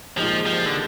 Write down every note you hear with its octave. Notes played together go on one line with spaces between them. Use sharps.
A#2 F3 G#3 D#4 G4
F3
D3